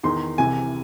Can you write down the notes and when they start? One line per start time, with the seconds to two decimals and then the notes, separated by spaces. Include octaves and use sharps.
0.03 E2 D#3 C6
0.38 C2 C3 E3 G#5